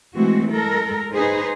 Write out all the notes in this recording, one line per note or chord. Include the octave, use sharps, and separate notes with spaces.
E3 G#3 A3 C4 F#4
G#3 A4 A#4
D#4 G#4 B4 C5